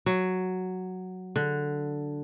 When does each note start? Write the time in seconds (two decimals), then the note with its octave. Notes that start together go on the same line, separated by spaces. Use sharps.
0.06 F#3
1.36 D3